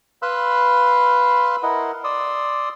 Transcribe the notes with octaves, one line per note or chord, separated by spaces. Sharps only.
B4 F5 B5 C6 E6 F#6
E4 A#4 D#5 F#5
D5 C6 D#6 E6